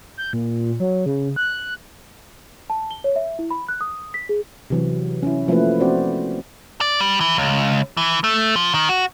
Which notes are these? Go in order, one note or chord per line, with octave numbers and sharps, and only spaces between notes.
G6
A#2
F#3
C#3
F#6
A5
G7
C#5
E5
E4
B5
F#6
D#6
B6
G#4
C3 E3 F#3
C#4 E4
F3 A3 A#3 C#4 E4 B4
C4 F#4 C5 D5
D5
G3
E3
C#2
E3
A3
F3
D#3
F#4